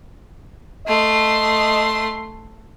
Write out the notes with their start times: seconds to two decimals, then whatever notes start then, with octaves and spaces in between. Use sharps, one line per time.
0.87 A3 D#5 C6